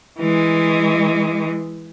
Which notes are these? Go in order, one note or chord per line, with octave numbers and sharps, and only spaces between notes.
E3 G#3